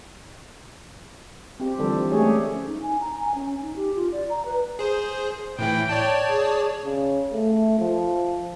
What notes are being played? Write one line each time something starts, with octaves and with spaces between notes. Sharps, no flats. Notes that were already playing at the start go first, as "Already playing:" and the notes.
C4 G4
D3 E3 F3 G3 A4
G#3 A3 C#4 G4 G#4 C#5
C#4
D#4
G#5
A#5
G#5
C#4
D#4
G4
F4
D5
A#5
B4
G#4 C5
A2 E3 E4 G5
C#5 D5 A5
G#4
C#3
A3
F3